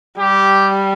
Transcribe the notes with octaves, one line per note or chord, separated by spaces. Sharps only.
G3 G4